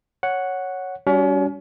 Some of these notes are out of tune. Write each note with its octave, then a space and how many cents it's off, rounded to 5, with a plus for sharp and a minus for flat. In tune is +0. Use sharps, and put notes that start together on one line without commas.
C#5 +0 F#5 +0
G3 +0 C#4 +35 F#4 +20